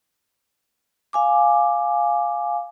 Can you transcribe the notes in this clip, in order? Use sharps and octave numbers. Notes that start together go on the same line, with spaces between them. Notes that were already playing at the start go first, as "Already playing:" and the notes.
F5 G#5 D6